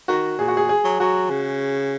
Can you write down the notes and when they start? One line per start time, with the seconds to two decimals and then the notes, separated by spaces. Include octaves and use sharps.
0.08 D#3 F#4
0.39 A#2 G#4
0.48 F#4
0.57 G#4
0.69 G#4
0.84 F#3
1.00 F#3 F#4
1.30 C#3